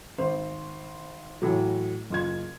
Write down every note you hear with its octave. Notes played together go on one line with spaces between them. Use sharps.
G#1 C5
A2 E3 F#3
F#1 F4 G#6